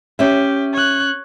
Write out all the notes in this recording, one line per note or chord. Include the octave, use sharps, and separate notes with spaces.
C#4 G4 E5
C#5 F#6